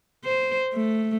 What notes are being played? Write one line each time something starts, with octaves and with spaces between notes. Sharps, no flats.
C5
A3